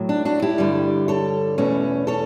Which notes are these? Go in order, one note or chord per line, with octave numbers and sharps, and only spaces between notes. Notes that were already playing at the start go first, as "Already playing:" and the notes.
Already playing: A2 F#3
D4
D4 F#4
E4 G4
G2 D3 G3
A4 C#5
E2 B2 A3 C#4
A4 C#5